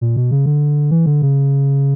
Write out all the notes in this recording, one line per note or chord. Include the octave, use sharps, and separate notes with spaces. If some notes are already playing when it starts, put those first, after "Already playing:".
A#2
B2
C#3
D3
E3
D3
C#3